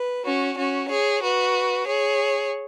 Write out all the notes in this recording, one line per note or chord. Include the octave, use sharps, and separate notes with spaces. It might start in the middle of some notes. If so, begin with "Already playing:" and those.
Already playing: B4
C#4 F#4
C#4 F#4
G#4 C#5
F#4 B4
G#4 C#5